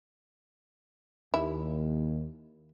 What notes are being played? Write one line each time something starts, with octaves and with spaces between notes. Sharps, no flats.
D#2 E4